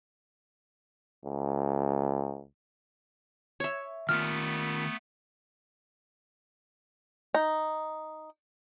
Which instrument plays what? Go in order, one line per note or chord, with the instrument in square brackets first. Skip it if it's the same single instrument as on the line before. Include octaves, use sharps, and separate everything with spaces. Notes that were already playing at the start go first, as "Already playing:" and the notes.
[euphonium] C#2
[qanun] C#5 E5
[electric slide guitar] D#3 F4 A#4 [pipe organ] A3 B3 [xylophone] F6
[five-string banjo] D#4